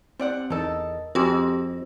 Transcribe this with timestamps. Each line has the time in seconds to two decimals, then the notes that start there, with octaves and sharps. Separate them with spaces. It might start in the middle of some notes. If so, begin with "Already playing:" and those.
0.20 G3 C4 D5 F#5
0.50 E2 D#4 A4 A#4 D#5
1.15 F2 G#3 C4 F#4 G4